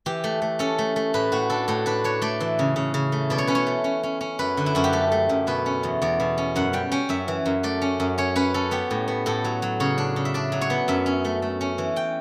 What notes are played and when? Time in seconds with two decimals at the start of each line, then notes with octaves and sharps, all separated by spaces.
0.06 E3 G4
0.24 A3
0.42 A3
0.59 C#4 A4
0.79 A3
0.96 A3
1.14 A2 B4
1.32 A2 F#4
1.50 D4 A4
1.68 A2 A4
1.86 D4 B4
2.04 D4 C#5
2.22 A3 D5
2.40 E3
2.59 C#3
2.76 C#3
2.94 C#3
3.12 A3
3.30 B2 D5
3.38 C#5
3.47 C#4 B4
3.55 C#5
3.66 A3
3.84 C#4
4.03 C#4
4.21 C#4
4.39 F#2 B4
4.57 D3
4.66 E4
4.75 F#2 F#4
4.84 G4
4.93 A3 A4
5.12 A3
5.29 F#2
5.47 B2 B4
5.66 C#4
5.83 E2
6.02 E2 D5
6.20 B2
6.38 C#4
6.56 F#2 F#5
6.73 G3 G5
6.92 C#4 G5
7.09 F#2 E5
7.28 E3
7.46 F#2
7.63 A3 D5
7.82 C#4
8.00 F#2
8.18 C#4 C#5
8.36 C#4 B4
8.54 C#4 A4
8.71 B3 G4
8.91 A2
9.08 B3
9.26 A2 A4
9.44 F#3
9.62 F#3
9.80 C#3 C#5
9.98 D4
10.16 C#3
10.25 E5
10.34 D4 D5
10.52 F#3
10.61 C#5
10.70 B3
10.88 F#2 E5
11.06 C#4
11.25 A3
11.42 A3
11.61 C#4
11.78 E3
11.96 G5